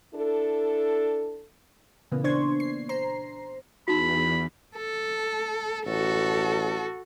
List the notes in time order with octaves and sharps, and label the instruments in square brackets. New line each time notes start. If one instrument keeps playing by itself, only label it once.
[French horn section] D4 E4 A4
[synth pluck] A#2 C#3 E3 A#3 B3
D4 C5 C6 C#6 G#6
C7
C5 A#5 C7
[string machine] E2 [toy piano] D#4 F#4 [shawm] B5
[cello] A4
[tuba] A1 [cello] F#4 A4